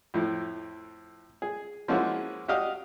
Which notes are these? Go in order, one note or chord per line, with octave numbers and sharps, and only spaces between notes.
F2 A2
G#4
F3 G#3 A#3 C#4 E4 F#4
F#4 G4 D#5 F5 D#6